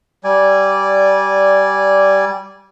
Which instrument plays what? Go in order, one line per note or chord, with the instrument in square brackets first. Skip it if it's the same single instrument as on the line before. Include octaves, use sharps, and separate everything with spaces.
[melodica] G3 D5 G#5